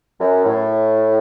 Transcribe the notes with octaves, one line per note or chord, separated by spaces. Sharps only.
F#2
A2